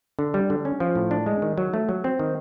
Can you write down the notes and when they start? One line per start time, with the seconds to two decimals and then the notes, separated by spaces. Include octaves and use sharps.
0.19 D3
0.34 G3
0.50 D3
0.65 C#4
0.80 F3
0.95 A2
1.11 D4
1.26 G#3
1.42 D#3
1.58 F#3
1.73 A3
1.89 F#3
2.04 C4
2.19 D#3